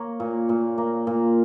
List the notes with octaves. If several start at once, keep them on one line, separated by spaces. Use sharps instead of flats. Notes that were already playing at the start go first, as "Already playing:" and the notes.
Already playing: A#3 C#5
A#2
A#2
A#3
A#2